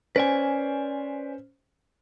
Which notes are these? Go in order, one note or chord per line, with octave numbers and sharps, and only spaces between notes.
C#4 B4 C5 D5 G#5